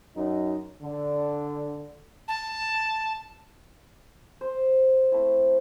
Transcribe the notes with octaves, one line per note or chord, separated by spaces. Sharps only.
F#2 D#4
D3
A5
C5
A3 C4 E4